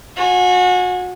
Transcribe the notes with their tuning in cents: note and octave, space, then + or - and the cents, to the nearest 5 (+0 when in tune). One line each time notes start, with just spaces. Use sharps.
F#4 -30 G#5 +0